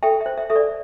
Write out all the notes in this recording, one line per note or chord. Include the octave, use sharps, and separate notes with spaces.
A4 E5 G5
E5
C5
E5
A4 E5
D5